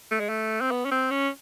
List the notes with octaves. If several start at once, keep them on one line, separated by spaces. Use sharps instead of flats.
A3
G#3
A3
C4
B3
C#4
C4
C#4